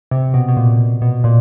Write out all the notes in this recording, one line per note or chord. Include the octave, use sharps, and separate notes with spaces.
C3
B2
B2
A#2
B2
A#2